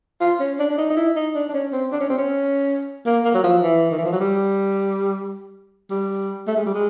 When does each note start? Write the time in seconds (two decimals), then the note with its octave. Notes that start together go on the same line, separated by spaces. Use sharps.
0.20 F4
0.40 C#4
0.59 D4
0.70 D4
0.78 D#4
0.90 D#4
0.97 E4
1.16 D#4
1.35 D4
1.49 D4
1.54 C#4
1.73 C4
1.92 D4
2.01 C#4
2.10 C4
2.18 C#4
3.06 A#3
3.24 A#3
3.34 F#3
3.44 F3
3.62 E3
3.91 D#3
3.98 E3
4.05 F3
4.13 F#3
4.20 G3
5.90 G3
6.48 A3
6.57 G#3
6.66 G3
6.75 G#3